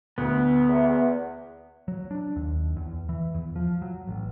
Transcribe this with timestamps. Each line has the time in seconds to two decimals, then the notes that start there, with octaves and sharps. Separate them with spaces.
0.18 D2 B3
0.68 E2
1.88 F#3
2.11 D4
2.36 D#2
2.76 E2
3.09 E3
3.34 E2
3.56 F3
3.82 F#3
4.07 A1